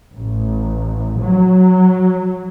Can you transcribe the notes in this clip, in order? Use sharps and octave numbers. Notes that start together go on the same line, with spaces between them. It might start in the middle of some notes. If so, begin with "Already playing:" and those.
A1
F#3